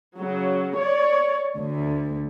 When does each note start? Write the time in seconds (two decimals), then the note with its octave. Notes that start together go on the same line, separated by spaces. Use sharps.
0.18 C#3 F#3
0.77 C#5 D5
1.56 D2